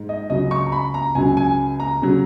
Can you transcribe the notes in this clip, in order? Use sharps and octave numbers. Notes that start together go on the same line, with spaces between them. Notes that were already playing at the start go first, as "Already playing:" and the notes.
Already playing: G#2
D#5
C#2 C#3 F#3 D#5
C#6
A#5
B5
A#5
C#2 C#3 F#3 G#5
G#5
A#5
C#3 F#3